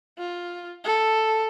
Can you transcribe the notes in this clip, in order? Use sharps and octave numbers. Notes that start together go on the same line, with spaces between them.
F4
A4